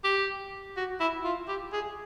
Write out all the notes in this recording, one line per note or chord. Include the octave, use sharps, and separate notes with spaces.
G4
F#4
E4
F4
G4
G#4